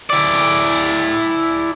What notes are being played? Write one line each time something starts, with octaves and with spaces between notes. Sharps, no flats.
E4 D5